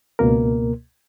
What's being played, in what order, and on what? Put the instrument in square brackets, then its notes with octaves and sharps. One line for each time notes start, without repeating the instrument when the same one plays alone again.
[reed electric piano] C#2 B2 A#3 A#4